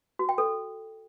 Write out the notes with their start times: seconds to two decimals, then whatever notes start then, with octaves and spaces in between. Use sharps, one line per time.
0.19 F#4
0.29 G5
0.38 A4